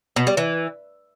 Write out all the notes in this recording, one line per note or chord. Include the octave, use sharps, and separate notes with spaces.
B2
G3
E3